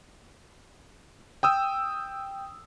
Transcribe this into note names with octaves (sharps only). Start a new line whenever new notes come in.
G5 D#6 E6